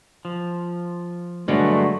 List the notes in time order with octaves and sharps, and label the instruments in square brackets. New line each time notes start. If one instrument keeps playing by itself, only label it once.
[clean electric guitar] F3
[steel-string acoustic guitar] G2 D3 F#3 [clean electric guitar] G#3 [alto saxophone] A3